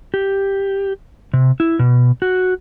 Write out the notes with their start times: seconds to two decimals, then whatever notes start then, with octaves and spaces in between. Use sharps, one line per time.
0.14 G4
1.34 C3
1.60 E4
1.79 B2
2.22 F#4